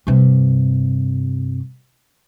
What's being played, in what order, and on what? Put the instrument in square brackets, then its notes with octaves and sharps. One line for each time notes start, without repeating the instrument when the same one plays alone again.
[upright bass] G2 C3